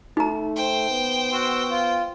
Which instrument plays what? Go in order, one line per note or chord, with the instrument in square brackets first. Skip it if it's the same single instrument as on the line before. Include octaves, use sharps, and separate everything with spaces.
[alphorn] A3 [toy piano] D#4 A#5
[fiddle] C5 G5
[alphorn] B3
[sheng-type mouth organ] F#4 C6 E6
F4